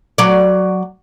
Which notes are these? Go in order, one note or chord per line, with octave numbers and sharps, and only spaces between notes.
F#3 D5